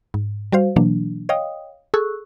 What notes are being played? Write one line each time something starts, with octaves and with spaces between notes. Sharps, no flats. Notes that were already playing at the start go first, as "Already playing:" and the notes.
G#2
G3 F#4 C5 F5
B2 E3 F#3 A#3 D4
C#5 D#5 F5 G5 D#6
G#4 A4 C#6 E6 F#6